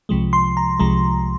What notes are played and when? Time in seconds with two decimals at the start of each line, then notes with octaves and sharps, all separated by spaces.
0.09 C2 C3 F3 G#3
0.33 C6
0.57 A#5
0.79 C2 C3 F3 G#3 A#5